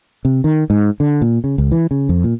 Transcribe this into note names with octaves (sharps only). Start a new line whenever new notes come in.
C3
D#3
G#2
D3
A#2
C#3
C#2
E3
C#3
F2
A#2